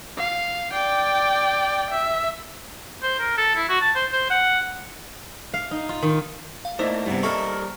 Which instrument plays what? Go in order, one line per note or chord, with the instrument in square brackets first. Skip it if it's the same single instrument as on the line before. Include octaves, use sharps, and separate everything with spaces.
[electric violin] F5
D5 G5
E5
[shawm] C5
A#4
A4
E4
F#4
A5
C5
C5
F#5
[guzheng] F5
D#4
F4
D#3
[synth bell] F5
[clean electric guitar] A3 A#3 [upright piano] D#4 E4 D5 [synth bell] C5
[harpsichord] G2 C3 [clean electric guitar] E3 B3
[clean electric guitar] G3 A#3 A#4 [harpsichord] E4 A4 D#5 [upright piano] C#6 F6